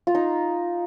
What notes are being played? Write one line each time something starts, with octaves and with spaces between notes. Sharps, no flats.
F4
D#4